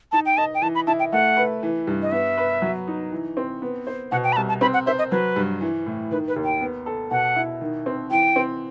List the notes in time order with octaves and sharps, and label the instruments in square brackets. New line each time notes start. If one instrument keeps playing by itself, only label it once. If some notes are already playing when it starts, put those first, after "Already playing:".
[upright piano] D#4 [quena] A5
[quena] G5
[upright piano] D#5 [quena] A5
[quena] G5
[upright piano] E3 [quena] A5
[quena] B5
[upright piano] E4 [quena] A5
[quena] G5
[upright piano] A3 [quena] F#5
[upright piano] B4
E3
G2
[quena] D#5
[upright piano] B3 [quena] E5
[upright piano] B4
F#3
D#4
E3
C4
B3
C5
[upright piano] B2 [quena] F#5
[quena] G5
B5
[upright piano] C2 [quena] A5
[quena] A5
[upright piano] C4 [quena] B5
[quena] F#5
[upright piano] C5 [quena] E5
[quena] D#5
[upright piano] F#3 [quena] B4
[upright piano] G2
E3
A2
[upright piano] D#3 [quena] B4
[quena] B4
[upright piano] D#2
[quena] G5
[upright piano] B3
A4
[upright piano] B2 [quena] F#5
[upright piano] E4
D#3
C4
[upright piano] E3 [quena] G5
[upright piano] C4